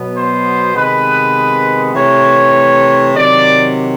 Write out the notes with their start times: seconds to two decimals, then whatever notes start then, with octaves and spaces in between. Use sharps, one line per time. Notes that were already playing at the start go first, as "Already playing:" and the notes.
Already playing: B2 F#3 B3
0.14 C5
0.74 C3 D#3 G#3 B3 B4
1.94 C3 E3 A3 C#5
3.14 C3 D#3 F#3 D5